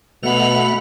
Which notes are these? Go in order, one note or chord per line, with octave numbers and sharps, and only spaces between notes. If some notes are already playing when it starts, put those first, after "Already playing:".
B2 A3 F#5 B5 F7